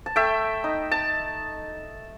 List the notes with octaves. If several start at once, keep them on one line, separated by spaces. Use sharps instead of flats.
A5
A3 E5 G5
D#4
A5